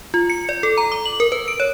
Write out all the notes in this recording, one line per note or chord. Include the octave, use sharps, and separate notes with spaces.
F4
C#7
D5
A4
A#5
D6
F#7
A#4
B4
D7
C#5